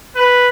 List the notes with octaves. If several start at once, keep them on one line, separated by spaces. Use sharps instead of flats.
B4